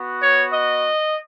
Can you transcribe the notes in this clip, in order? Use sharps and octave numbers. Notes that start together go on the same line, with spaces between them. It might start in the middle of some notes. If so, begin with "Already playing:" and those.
Already playing: B3 F#4
C#5
D#5